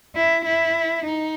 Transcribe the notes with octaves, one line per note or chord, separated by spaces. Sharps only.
E4
E4
D#4